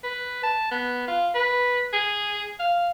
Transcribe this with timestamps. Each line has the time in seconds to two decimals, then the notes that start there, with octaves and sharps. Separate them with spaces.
0.04 B4
0.43 A5
0.71 B3
1.08 F4
1.35 B4
1.93 G#4
2.59 F5